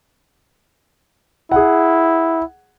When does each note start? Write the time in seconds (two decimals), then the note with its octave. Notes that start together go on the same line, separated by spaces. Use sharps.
1.52 E4 G#4 F#5